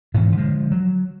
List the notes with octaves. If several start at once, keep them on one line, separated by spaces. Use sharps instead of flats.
G#2 B2 D#3 E3
D3 F3 G#3
F#3